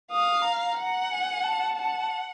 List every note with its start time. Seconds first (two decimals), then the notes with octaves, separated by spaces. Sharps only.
0.11 F5 D#6
0.45 A#5
0.78 F#5
1.11 G#5
1.44 A5
1.77 F#5